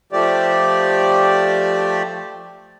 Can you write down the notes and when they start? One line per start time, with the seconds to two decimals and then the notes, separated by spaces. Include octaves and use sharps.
0.13 F3 A3 G4 D5